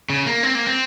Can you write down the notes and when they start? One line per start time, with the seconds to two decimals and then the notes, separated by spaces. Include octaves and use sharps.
0.10 C#3
0.26 A#3
0.43 C4
0.55 A#3
0.67 C4